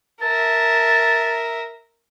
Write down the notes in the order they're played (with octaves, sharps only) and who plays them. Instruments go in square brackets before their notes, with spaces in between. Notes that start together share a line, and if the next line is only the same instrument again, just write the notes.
[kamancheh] A#4 E5 [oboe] A5